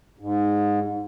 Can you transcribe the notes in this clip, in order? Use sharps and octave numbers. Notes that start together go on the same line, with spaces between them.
G#2